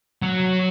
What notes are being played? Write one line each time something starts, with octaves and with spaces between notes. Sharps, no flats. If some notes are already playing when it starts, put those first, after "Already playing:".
F#3